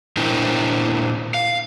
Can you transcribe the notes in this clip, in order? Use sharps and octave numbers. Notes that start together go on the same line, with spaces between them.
A#2 D4 E4 A#4 C5 G5
F5